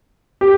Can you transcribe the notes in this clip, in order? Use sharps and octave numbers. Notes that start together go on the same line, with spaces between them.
G4